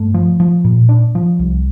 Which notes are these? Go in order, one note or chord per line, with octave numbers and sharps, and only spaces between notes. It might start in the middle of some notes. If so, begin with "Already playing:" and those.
Already playing: G2 A3
F3
F3
A#2
D4
F3
C2